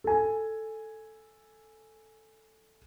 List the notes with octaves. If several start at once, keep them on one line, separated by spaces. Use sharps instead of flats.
A4 G#5